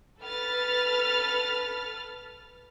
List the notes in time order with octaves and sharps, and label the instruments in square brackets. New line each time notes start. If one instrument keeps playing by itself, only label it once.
[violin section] A4 B4 F6 A6